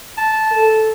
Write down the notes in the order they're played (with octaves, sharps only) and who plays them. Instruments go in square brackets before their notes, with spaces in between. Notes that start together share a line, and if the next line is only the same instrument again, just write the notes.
[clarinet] A5
[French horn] A4